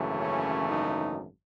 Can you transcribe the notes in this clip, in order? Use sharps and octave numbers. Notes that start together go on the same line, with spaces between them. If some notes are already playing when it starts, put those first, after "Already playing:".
Already playing: G#1 F#2 C#3 E3 A3
C#4
D#4